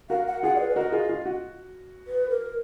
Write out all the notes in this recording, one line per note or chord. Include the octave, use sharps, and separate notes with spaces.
F#4 A#4 F5
F#5
F4 G#4 F#5
D5
B4
D5
F#4 A#4 D#5
F4 G#4
F4
F#4
B4
A#4